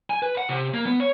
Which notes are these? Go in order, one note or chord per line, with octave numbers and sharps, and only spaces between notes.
G#5
B4
F#5
C3
A#3
B3
C#5